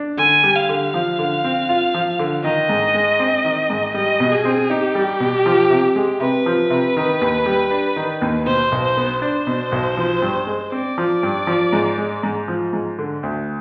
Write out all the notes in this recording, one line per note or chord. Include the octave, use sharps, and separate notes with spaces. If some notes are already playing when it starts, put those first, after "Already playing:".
Already playing: D4
D3 G#5
G3
F5
D3
F3 F5
D3
C4
F4
F3
D3
D#3 D#5
G#2
G#3
C4
D#3
G#2
G3 D#5
B2
G#4
C4
D#4 G4
G3
B2
F3
C3
G#3
C3 B4
F3
C3
D#3
D#2
G3
D4
D#3
D#2
B2 C5
B1
C5
B3
D4 C5
B2
B1
F3
G2
G#3
C4 D5
F3
G2
F3
G#2
G#3
G#2
F3
G#2
D3
D2